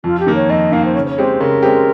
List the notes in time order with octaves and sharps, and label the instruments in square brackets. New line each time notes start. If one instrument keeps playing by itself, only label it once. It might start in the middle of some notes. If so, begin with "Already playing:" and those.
[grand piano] F2 [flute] F4
[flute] G4
[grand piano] D#3 A#3
[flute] C#5
[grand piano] F2 [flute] D#5
[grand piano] D#3 A#3 [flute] F5
[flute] C5
[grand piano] C#3 [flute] C#5
[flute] C5
C#5
[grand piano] G#3 C4 G4
[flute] C5
[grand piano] C#3 [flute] A#4
[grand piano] G#3 C4 G4